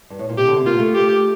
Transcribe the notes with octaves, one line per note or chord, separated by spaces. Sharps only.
G2
A2
A#2
C3 G4
D3
C3
A#3 F4
A3
G4